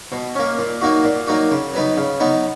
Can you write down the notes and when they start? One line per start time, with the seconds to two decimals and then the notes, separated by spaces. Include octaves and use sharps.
0.12 B2
0.35 A#3 C#4
0.59 A#2
0.81 F#3 A#3 D#4 F#4
1.04 A#2
1.27 F#3 A#3 D#4 F#4
1.51 C#3
1.73 F#3 B3 D#4
1.97 C#3
2.20 F#3 B3 D#4